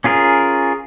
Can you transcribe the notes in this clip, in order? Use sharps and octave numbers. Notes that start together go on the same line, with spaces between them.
C#4 F4 G#4 A#4